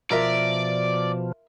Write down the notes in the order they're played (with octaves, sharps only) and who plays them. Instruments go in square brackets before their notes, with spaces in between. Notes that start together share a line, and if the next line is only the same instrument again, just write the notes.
[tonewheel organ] B2 F3 [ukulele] F4 A#4 E5 [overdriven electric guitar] D5